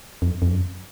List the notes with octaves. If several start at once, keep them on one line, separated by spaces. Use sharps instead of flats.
F2
F2
F#2